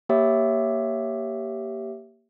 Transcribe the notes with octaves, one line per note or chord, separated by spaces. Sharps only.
A#3 G4 C#5 E5